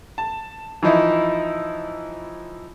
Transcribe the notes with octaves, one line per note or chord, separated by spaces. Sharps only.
A5
E3 F3 D#4 E4